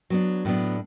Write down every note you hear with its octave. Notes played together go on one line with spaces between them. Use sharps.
F#3 B3 D4
A2 F#3 B3 D4